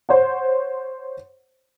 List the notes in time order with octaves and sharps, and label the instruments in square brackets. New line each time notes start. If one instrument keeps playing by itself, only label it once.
[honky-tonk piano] C5 C#5 F#5